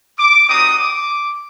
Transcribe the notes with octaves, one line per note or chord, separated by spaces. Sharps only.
D6
G3 C4 D#4 F#4 D#6
D6